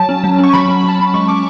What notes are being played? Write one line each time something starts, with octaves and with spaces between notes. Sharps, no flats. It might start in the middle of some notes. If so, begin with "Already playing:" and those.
Already playing: F#3 A5
C#4
F#3
C#4 C#6
F#3 B5
C#4
F#3
A5
C#4 B5
G#3 C#6
C#4 D6